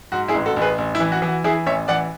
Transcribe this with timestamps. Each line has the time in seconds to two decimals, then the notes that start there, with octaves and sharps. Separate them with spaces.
0.12 G#2 F#4
0.28 E4 G#4
0.34 A1
0.45 F#4 A4
0.56 A1
0.62 G#4 B4
0.78 A1
0.95 E4
1.00 E3
1.12 F#4
1.22 E3
1.28 F#4
1.44 E3 E4 G#4
1.66 A1 C#5 E5
1.88 E3 D5 F#5